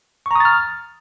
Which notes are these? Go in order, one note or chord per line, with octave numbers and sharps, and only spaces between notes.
A#5 C#6 D#6 F6 A6